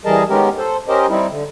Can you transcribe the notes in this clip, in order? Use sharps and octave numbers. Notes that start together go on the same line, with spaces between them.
E3 G3 G#4 A#4 D#5 A5
D#3 G#3 B3 C#4 G4 A#4
A4 C5
C#4 G4 A#4 C5 D#5
G3 C4 D#4 E4
D3